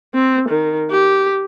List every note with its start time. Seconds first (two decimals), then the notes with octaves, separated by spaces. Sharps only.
0.15 C4
0.49 D#3
0.91 G4